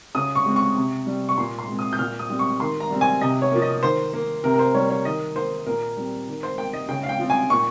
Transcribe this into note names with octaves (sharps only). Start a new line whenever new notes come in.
C#3 D#6
C#6
G#3 C4
C#6
C3
G3 C4
C#6
A#2 C6
C6
G#3 C4
D#6
G6
A#2 F6
D#6
G3 C4
C#6
D#3 C6
A#5
G3 C4
G#5
C3 D#5
C#5
F3 A#3
D#5
D#3 C5
A#3
C3 A#4
A#4
C5
G3 A#3 C#5
C#5
D#3 D#5
A#3 C5
A#2 A#4
G3 C4
D#3
C5
A#3 G5
D#5
C#3 G5
F5
G5
F3 C4
G#5
A#2 C#6